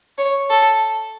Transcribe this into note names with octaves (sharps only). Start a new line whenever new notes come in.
C#5
A4